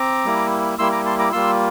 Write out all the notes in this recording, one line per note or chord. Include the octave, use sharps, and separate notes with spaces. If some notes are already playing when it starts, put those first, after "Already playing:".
Already playing: C4 A#5 D6
G3 A#3 E4
G3 A#3 E4 C6 E6
A#5 D6
A5 C6
A#5 D6
G3 A#3 F4 C6 E6